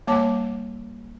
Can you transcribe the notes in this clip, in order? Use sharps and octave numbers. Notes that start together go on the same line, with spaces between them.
G3 A#3 C#5 F#5 A5 D6